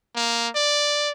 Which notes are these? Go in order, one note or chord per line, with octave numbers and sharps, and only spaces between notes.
A#3
D5